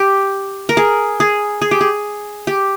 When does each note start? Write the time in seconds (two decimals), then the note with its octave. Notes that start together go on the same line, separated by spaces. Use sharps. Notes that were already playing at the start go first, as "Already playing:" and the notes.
Already playing: G4
0.69 A#4
0.77 G#4
1.20 G#4
1.62 G#4
1.71 G4
1.81 G#4
2.47 G4